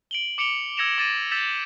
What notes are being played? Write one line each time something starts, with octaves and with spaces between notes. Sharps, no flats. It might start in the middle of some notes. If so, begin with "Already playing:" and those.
D7 F#7 G7
D6 C#7 D7 F7 G7
E6 G#6 A#6 C#7 E7 F7
D6 A6 A#6 D#7
E6 G6 A6 B6 E7